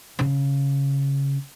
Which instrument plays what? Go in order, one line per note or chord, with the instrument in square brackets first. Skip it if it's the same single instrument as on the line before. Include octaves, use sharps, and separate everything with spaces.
[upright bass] C#3